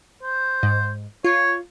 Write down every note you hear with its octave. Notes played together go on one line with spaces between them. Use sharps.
C5
G#2
F4 C#5